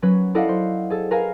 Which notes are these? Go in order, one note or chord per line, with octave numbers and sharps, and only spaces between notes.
F#3 C#4 B4
E4 A4 D5 D#5 F5 F#5
C5
G#4 A4
A#4 B4 F5 G#5 A#5